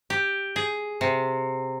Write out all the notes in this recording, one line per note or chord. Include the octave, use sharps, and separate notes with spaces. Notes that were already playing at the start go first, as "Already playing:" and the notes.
G4
G#4
C3